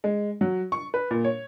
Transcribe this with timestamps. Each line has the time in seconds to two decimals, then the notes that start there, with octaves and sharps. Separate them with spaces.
0.04 G#3
0.41 F#3
0.72 C#6
0.94 B4
1.11 A#2
1.24 C#5